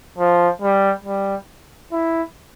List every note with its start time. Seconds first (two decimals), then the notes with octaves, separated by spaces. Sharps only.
0.18 F3
0.62 G3
1.05 G3
1.92 E4